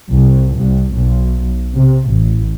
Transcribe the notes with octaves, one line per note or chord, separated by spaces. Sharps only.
C2
C2
B1
C3
A1